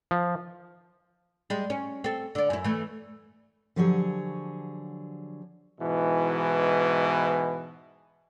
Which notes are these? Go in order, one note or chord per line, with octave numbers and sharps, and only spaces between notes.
F3
G3 G#3
C#4
C4 A4
D3 D5
F#2 E4
E3 A3
D3 F3 F#3 G4 G#4 C#5
G#2 B2 E3